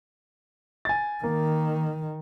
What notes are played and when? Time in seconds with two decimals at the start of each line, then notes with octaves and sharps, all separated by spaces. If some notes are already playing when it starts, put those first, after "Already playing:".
0.85 G#5 A6
1.24 D#3 A#3